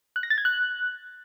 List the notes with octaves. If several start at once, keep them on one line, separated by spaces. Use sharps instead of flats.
F#6
A#6
A6
G#6
F#6